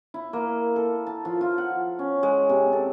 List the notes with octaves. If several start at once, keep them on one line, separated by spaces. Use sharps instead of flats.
E4
A#3
A4
A5
F3
F4
F#5
C#4
G#3
C3
A4